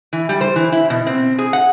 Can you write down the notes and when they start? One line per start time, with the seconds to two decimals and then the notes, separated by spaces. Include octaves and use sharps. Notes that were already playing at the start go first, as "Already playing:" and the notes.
0.13 E3
0.29 G3
0.41 C5
0.56 E3
0.72 E4
0.90 B2
1.07 C4
1.38 G#4
1.53 F#5